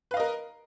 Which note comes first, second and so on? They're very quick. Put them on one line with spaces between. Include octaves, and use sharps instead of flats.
B4 F5 D#5 A#4